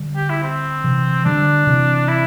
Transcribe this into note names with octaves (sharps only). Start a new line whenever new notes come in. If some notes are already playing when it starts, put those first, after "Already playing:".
Already playing: D3 G3
G4
E4
C4
C3 E3
D3 G3 D4
C3 E3
E4